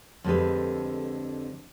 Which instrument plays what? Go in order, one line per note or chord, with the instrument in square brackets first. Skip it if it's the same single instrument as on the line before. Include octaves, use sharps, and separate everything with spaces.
[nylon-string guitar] F2 D3 G#3 G4 B4